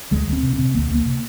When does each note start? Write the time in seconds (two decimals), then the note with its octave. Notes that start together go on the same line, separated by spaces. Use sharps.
0.11 D2 G#3
0.28 D2 C4
0.43 C3
0.53 C4
0.59 C3
0.75 D2 A#3
0.90 D2 A#3
1.06 C3